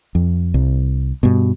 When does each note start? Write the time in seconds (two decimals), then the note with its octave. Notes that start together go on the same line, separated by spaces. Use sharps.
0.15 F2
0.54 C2
1.23 G2 B2